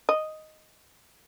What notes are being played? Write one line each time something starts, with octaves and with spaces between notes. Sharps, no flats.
D#5